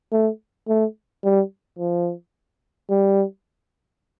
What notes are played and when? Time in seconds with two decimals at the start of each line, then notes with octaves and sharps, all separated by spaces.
0.12 A3
0.68 A3
1.24 G3
1.79 F3
2.90 G3